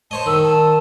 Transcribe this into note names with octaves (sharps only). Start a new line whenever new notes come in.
C5 C#5 D#5 A5
D#3 E6
A5